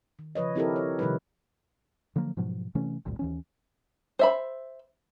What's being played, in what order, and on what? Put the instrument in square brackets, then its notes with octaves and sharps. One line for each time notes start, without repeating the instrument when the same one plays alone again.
[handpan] D#3
C#3 F3 B4 C#5 D#5
C4 E4 G4 A4 A#4
C#5
C3 D#3 F3 G3 D#4 B4
[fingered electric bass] D3 F3 F#3 A#3
G#2 B2 F3 F#3
C3 E3 A3 C#4
G#1 D2 G2 A#2
D#2 E3 C#4
[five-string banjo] C5 E5 B5